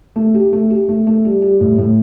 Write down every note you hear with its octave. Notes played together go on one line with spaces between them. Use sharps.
A3
G4
A3
G4
A3
A3
G3
G3
A2
A2